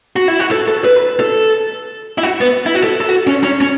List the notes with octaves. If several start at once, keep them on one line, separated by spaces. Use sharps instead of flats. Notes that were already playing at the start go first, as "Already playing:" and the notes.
F#4
E4
F#4
A4
A4
B4
A4
E4
F#4
B3
E4
F#4
A4
A4
F#4
C#4
C#4
C#4